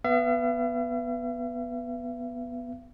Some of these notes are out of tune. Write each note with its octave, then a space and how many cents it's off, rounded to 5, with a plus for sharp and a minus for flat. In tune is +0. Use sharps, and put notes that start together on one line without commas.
B3 +0 E5 +45